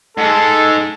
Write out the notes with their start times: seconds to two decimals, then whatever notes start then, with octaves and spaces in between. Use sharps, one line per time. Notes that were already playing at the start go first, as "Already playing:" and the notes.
0.17 G#2 G#3 A4